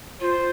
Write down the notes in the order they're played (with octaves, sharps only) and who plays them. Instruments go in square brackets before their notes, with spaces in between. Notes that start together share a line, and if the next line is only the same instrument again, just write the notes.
[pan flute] F4 [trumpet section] C5